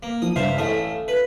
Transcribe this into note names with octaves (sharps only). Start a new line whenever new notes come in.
A#3
F3 D#6
C#2 G2 C5 E5 F5
A1 A3 E4 A4 F5 D#6
B4